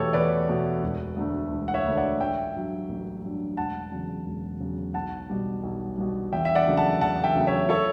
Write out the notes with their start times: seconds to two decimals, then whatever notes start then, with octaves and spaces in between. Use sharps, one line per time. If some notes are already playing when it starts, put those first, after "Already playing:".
Already playing: E2 B2 A3 G4 A4 B4 C#5
0.13 E2 B4 D5
0.48 B2 A3
0.83 E1
1.16 D2 D3 A3
1.51 E1
1.68 F#5
1.74 C#5 E5
1.86 D2 D3 A3
1.97 D5 F#5
2.20 A1 E5 G5
2.54 G2 F#3
2.89 A1
3.23 G2 F#3
3.57 E1 F#5 A5
3.91 E2 C#3 F#3
4.26 E1
4.60 E2 C#3 F#3
4.94 B1 F#5 A5
5.30 B2 G3
5.63 B1
5.97 B2 G3
6.32 E2 E5 G5
6.45 E5
6.55 D5 F#5
6.66 C#3 F#3 A3
6.77 F#5 A5
7.01 E2 F#5 A5
7.24 E5 G5
7.35 C#3 F#3 A3
7.47 C#5 E5
7.69 A4 C#5